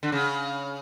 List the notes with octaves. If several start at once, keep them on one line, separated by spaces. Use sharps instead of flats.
D3
C#3